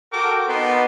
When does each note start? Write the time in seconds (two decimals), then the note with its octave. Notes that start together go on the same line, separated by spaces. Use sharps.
0.13 F#4 A4 A#4 G5 D6
0.48 B3 D#4 B4 A5 C6